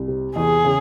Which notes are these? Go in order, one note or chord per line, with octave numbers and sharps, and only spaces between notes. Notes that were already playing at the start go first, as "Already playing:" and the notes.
Already playing: C2
C3
E2 G#4
C#3